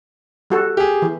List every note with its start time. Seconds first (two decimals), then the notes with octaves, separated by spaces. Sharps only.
0.50 G3 F#4 A4
0.77 G4 G#4
1.02 E3